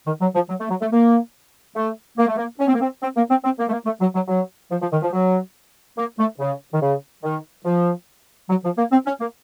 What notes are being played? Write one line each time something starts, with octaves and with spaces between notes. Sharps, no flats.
D#3
F#3
F3
F#3
A3
F#3
A3
A#3
A3
A#3
A3
A#3
C#4
C4
A#3
C4
C4
A#3
C4
C4
A#3
A3
A#3
A3
F#3
F#3
F#3
F3
F3
D#3
F3
F#3
A#3
A3
C#3
D#3
C#3
D#3
F3
F#3
F3
A#3
C4
C#4
A#3